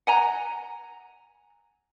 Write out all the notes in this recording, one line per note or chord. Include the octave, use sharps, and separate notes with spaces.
F#5 G#5 A#5